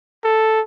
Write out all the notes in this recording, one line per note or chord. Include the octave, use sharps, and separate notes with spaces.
A4